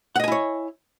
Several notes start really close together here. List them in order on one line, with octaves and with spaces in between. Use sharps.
F#5 D#5 G#5 E4 C#5